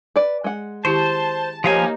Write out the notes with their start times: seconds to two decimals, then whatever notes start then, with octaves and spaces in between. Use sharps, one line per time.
0.16 B4 D5
0.44 G#3 F#5
0.85 D#3 E4 G4 C5 A5
1.64 F3 A#3 D#4 G4 C#5 F5 G#5